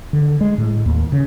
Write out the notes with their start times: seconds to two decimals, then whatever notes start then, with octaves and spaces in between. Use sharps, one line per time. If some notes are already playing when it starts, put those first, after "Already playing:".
0.13 D3
0.41 G#3
0.58 A2
0.86 D#2
1.12 C#3